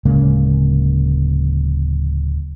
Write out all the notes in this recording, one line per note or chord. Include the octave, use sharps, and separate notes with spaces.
D1 C#3 G#3 A#3